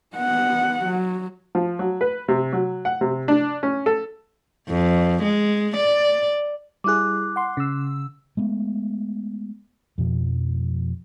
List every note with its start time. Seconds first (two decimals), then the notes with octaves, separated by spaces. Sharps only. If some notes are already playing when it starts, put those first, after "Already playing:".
0.16 B3 F#5
0.84 F#3
1.55 F3
1.79 F#3
2.01 B4
2.28 C3
2.53 F#3
2.85 F#5
3.01 C3
3.28 D4
3.63 C#4
3.86 A4
4.68 F2
5.23 G#3
5.76 D5
6.84 G3 E4 G#4 D6 F#6
7.36 F#5 C6
7.57 C#3 E6
8.37 G#3 A3 B3
9.98 F2 B2 F3